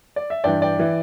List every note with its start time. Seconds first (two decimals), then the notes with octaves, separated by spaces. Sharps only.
0.16 D5
0.30 E5
0.44 G2 E3 D5 G5
0.62 D5 G5
0.79 E3